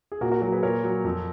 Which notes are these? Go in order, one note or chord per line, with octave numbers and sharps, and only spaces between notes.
G#4
A#2 F#4 A#4
F#4 A#4
F#3 F#4 A#4
G#4 B4
A#2 A#4 C#5
F#3
F2